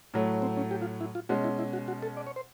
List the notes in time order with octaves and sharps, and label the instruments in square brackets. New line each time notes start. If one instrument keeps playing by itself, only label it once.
[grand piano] A2 F#3 A3
[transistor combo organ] C4
C#4
G4
F4
E4
F4
[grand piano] B2 G#3 C#4 [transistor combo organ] F#4
[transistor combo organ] E4
E4
F#4
F#4
A4
D5
C#5
C5